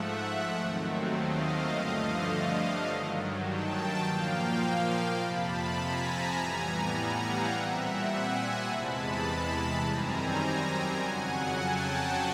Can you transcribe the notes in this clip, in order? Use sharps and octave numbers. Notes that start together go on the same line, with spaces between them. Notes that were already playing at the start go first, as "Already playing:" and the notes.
Already playing: G#2 F3 A3 E5 F#5
D#2 D#3 F#3 A3 C4
D#5 F5
G2 D3 F3 A3 D#5 F5
G2 D#3 F#3
G5 A5
A#2 F3 A#3 F5 G5
F2 C3 F3 A5 B5
G#5 A#5
A2 E3 G3 B3 G#5 A#5
F#5 G#5
F5 G5
A#2 G3 C4 E5 F#5
F#5 G#5
E2 C3 E3 G#3 A5 B5
F#2 D#3 G3 C4 G#5 A#5
F2 C#3 F#3 F#5 G#5
G5 A5